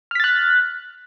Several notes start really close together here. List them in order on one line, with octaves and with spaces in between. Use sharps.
F6 B6 A6 F#6